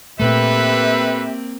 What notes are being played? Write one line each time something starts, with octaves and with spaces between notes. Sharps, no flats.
A#2 A3 A#3 C4 G4 A4 B4 E5